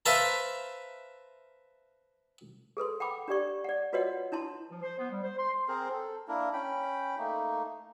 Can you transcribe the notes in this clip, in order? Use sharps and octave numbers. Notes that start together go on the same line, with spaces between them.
B4 C5 E5 F5 A5 A#5
G#4 A4 B4 C6
F#5 G5 B5 D6
D4 G4 D5 C#6
D5 F#5
F4 F#4 B4 C#5 D#5 F#5
D4 E4 A5 C6
F3
C5
B3
G3
C5
C6
C4 G#4 A#4 C5
A4
A#3 D4 E4 A#4
C#4 G5 B5
A3 A#3 D#4